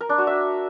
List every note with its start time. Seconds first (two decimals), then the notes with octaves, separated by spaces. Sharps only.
0.01 A#4
0.09 D4
0.18 F#4
0.27 E5